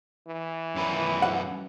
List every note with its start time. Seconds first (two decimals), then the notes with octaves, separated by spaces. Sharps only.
0.27 E3
0.75 F#2 B4
1.22 F#5